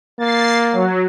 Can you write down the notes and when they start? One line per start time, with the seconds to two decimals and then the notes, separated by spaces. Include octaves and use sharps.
0.19 A#3 A6 C7
0.72 F#3